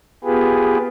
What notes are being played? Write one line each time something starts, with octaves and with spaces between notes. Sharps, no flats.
B3 F4 G4 G#4 B4